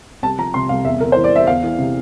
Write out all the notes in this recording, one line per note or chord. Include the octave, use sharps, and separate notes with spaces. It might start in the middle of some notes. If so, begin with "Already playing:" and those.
C2 A5
F3 A#5
C3 C6
C2 F5
E2 E5
E2 A#4
E3 C5
D5
E3 E5
E2 F5
E3
C3